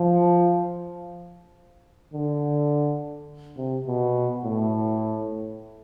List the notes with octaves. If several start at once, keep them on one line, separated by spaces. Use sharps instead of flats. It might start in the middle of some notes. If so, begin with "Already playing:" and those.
Already playing: F3
D3
C3
B2
A2